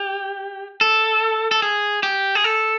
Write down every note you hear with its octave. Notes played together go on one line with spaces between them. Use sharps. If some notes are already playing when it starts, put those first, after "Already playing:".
Already playing: G4
A4
A4
G#4
G4
G#4
A4